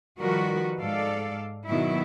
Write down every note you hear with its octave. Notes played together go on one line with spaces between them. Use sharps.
D#3 F3 G3 F#4 A#4 B4
G#2 A4 D5 F5
B2 D#3 F#3 E4